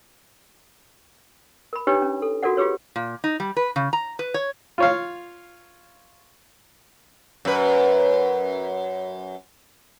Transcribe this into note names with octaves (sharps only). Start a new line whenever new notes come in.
A#4 B5
D4 D#4 G4 B4 C#5 D5
C#4
A4
F4 F#4 A4 A#4 D5 F#5
F4 G4 G#4 B4 C#5
A#2
D#4
G3
B4
C#3
A#5
B4
C#5
F4 C#5 F5
F#2 B4